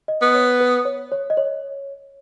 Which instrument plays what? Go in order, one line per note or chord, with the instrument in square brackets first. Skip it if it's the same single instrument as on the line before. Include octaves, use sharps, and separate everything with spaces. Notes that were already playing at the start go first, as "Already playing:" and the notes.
[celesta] D#5
[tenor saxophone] B3
[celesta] C#5
B4
C#5
C#5
D#5
C#5